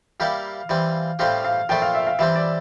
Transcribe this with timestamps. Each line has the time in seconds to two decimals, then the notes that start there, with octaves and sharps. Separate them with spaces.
0.20 G3 A#3 E4 G4 F5
0.69 E3 G3 C4
1.19 A2 G3 C4 G4 F5
1.44 F5
1.69 A#2 F3 A3 E4 G5
1.82 F5
1.95 E5
2.07 F5
2.19 E3 G3 C4 E5
2.35 D5